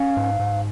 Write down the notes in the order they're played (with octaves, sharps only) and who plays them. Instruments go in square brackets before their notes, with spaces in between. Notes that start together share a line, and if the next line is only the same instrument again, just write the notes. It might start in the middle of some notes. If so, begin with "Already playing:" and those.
Already playing: [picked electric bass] C#4 [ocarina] F5
[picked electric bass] G#2
G#2